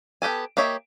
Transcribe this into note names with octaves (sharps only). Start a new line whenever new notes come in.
B3 G4 A4 G#5
A#3 G4 C#5 D#5 E5